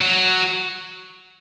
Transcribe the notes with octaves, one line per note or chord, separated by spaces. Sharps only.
F#3